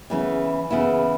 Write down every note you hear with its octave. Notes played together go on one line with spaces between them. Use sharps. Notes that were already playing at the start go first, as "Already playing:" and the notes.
C#3 E3 B3 E4
C#3 E3 B3 E4